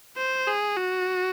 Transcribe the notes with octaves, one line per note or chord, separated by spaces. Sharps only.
C5
G#4
F#4